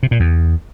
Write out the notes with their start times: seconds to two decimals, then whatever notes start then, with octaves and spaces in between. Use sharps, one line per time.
0.03 C3
0.11 A#2
0.20 E2